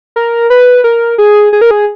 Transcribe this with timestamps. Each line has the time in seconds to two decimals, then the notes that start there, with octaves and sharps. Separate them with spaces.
0.16 A#4
0.50 B4
0.84 A#4
1.18 G#4
1.53 G#4
1.61 A#4
1.71 G#4